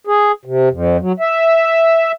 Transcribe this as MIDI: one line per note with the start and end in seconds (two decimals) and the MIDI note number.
0.07 0.32 68
0.45 0.69 48
0.71 0.97 41
1.00 1.12 54
1.20 2.12 76